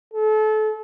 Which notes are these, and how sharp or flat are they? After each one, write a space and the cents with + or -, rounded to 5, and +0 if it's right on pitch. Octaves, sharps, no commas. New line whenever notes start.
A4 -30